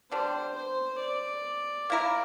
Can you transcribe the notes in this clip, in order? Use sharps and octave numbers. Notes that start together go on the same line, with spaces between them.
D3 G3 D4 C5
C5
D5
A#3 E4 A#4